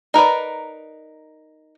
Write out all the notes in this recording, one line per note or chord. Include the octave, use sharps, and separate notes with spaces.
D#4 A#4 B4 D5